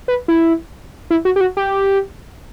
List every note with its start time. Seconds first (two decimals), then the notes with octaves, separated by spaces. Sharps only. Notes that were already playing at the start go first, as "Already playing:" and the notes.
0.08 B4
0.28 E4
1.10 E4
1.25 F#4
1.36 G4
1.41 F#4
1.57 G4